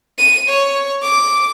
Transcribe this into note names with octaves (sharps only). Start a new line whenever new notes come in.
D#7
C#5
D6